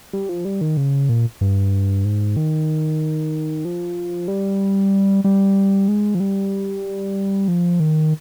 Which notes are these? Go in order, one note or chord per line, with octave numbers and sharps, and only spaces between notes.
G3
F3
G3
D#3
C#3
A#2
G2
G#2
D#3
F3
G3
G3
G#3
F3
G3
F3
D#3